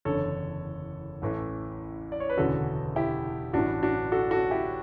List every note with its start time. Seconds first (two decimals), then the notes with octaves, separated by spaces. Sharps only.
0.05 F#1 E2 D3 A4 C#5
1.22 A1 A2 E3
2.12 D5
2.20 C#5
2.29 B4
2.37 E1 D2 C#3 E3 F#4 A4
2.96 E4 G4
3.53 A1 G2 E3 D4 F#4
3.83 D4 F#4
4.12 F#4 A4
4.31 F#4 A4
4.51 E4 G4